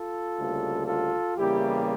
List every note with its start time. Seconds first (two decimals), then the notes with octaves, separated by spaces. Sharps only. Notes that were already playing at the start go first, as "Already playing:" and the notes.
Already playing: F4 A4
0.38 D2 C#3 G3 A#3
0.87 F4 A4
1.37 E2 C#3 G3 A#3 E4 G4